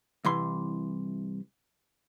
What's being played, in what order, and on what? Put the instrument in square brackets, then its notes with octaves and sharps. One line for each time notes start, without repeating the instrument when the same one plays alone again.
[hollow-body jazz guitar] C2 E3 C6